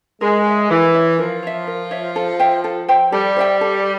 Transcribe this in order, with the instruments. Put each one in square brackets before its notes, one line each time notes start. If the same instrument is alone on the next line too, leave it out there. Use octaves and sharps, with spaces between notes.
[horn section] G#3 [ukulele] A#4
[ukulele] C#5 E5
[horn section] E3 [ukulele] A#4
[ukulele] C#5 E5
[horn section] F3 [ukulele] A#4
[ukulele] C#5 E5
A#4
C#5 E5
A4
C5 E5 G5
A4
C5 E5 G5
[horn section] G3 [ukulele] A4
[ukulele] C5 E5 G5
A4